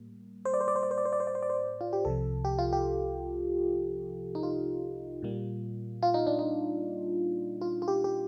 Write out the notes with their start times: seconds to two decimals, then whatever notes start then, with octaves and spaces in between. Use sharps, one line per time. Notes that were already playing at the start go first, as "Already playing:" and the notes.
Already playing: A2 G3 A#3
0.45 C5
0.54 D5
0.61 C5
0.68 D5
0.76 C5
0.83 D5
0.91 C5
0.98 D5
1.06 C5
1.13 D5
1.20 C5
1.27 D5
1.35 C5
1.43 D5
1.50 C5
1.81 F4
1.93 G4
2.05 C2 C3 F3 A4
2.45 G4
2.59 F4
2.73 G4
4.35 D#4
4.43 F4
5.22 A#2 G3 A#3
6.03 F4
6.14 D#4
6.27 D4
6.39 D#4
7.61 F4
7.82 F4
7.88 G4
8.04 G4